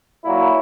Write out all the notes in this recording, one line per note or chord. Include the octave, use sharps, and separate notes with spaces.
A#2 F#3 A#3 E4